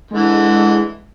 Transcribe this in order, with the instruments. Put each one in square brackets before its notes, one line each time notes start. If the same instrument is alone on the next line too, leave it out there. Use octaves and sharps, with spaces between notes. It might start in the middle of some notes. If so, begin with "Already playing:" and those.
[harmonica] D3 E3 [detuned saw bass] G#3